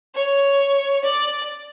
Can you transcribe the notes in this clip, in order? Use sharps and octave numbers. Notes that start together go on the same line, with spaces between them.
C#5
D5